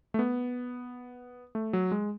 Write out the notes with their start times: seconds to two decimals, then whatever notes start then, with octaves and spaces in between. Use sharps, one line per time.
0.14 A3
0.19 B3
1.55 A3
1.73 F#3
1.92 G#3